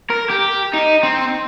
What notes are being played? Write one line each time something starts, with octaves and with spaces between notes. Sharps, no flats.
A#4
G4
D#4
C4